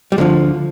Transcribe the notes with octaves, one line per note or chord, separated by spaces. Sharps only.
G3
D2 D3 F3 G#3